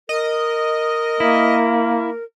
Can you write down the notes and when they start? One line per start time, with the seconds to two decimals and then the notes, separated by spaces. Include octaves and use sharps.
0.09 A#4 D#5
1.20 A#3 E4